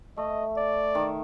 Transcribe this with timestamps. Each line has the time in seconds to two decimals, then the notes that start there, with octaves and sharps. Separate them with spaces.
0.17 A3 D#5
0.57 D5
0.95 D#3